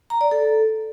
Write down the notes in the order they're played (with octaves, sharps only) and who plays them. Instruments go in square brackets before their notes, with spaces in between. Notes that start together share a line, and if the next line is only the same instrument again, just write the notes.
[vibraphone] A#5
D5
A4